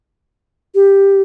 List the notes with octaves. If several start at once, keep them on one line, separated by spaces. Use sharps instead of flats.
G4